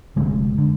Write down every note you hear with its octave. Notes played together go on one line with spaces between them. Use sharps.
F1 D#2 D3 G#3
D3